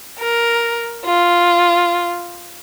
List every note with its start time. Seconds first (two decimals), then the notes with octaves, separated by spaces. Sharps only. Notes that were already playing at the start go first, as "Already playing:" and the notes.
0.19 A#4
1.05 F4